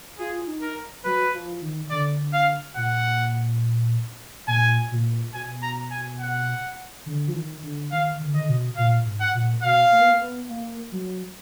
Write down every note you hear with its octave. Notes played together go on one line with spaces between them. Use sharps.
F4 G#4
D#4
A#4
F#3 B4
F3
D#3
D3 D5
F5
A#2 F#5
A#2 G#5
A#2
B2 G#5
A#5
G#5
F#5
D3
F3
D#3
D3
D#3 F5
D3
D#3 D#5
D3
B2
A#2 F5
G#2
F#5
A#2
B2 F5
A#3
B3
A#3
B3
A#3
F#3